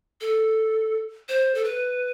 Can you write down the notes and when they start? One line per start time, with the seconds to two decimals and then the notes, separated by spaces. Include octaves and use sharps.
0.21 A4
1.29 C5
1.55 A4
1.64 B4